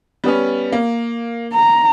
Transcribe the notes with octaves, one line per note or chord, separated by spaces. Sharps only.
G3 B3 C#4
A#3
A#5